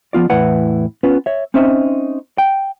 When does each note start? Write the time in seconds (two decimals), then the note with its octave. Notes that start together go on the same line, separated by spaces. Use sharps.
0.13 F3 B3 F4 D5
0.30 E2 A2 E3 E4 B4 F#5
1.03 B3 C#4 F4 B4
1.26 C#5 E5
1.54 C4 C#4 D#4 C5 E5
2.38 G5